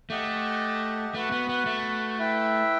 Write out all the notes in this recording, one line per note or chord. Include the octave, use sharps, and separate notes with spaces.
A3 G4 D#5 F#5
A3 F#4 B4 F#5
B3
B3
A3
E4 B4 E5 G5